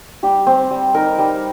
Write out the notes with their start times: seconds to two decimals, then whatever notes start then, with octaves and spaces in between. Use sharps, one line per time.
0.23 G3 G4
0.47 C4
0.71 G3
0.94 D#4 A#4
1.18 G3